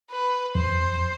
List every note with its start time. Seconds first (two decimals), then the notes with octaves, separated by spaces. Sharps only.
0.11 B4
0.55 F2 C5